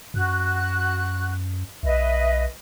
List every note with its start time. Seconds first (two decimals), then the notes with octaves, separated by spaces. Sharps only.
0.14 F#2 F#4 F#6
1.83 B1 B4 D#5 E5